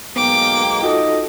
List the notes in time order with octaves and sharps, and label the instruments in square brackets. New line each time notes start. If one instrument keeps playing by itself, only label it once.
[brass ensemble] B1 G#3 A#3 [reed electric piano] B3 [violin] G5 D6
[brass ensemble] D#4 D#5 [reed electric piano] F4 F#4 A4